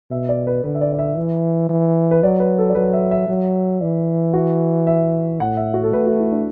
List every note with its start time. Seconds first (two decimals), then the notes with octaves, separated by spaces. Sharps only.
0.11 B2 E5
0.29 D5
0.47 B4
0.64 D3 B4
0.75 E5
0.81 D5
0.92 D5
0.99 E5
1.17 E3
1.69 E3
2.11 B4
2.23 F#3 D5
2.40 B4
2.58 A4
2.69 D5
2.75 F#3 B4
2.93 E5
3.11 E5
3.28 F#3
3.81 E3 D5
4.34 F#4
4.87 E5
5.40 A2 F#5
5.57 E5
5.74 F#4
5.84 A4
5.93 A3 B4
6.07 F#4
6.20 E4
6.32 D4